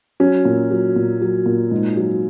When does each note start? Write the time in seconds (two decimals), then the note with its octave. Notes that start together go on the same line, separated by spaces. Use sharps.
0.20 F#3 C#4
0.45 A#2
0.71 F#3
0.96 A#2
1.21 F#3
1.46 A#2
1.71 G#2
1.97 F#3